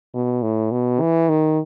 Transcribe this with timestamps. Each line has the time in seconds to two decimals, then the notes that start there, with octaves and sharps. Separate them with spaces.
0.14 B2
0.43 A2
0.72 B2
1.01 E3
1.29 D#3